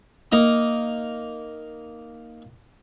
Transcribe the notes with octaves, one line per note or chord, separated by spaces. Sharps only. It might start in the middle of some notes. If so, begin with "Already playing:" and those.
A#3 D#4 A#5 D#6